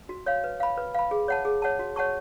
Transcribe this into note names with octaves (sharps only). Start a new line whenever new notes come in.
F#4
C#5 F5
B4
F5 B5
B4
F5 B5
G#4
C#5 F#5 A5
G#4
C#5 F#5 A5
F#4
C#5 F#5 A5 C#6